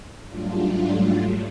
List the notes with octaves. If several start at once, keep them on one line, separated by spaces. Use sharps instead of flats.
G#2 F#3 G3 A3 D4 F4